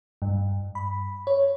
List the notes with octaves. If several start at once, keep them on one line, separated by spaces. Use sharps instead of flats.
G2
B5
C#5